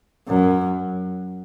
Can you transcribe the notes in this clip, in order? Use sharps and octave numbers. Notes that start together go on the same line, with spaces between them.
F#2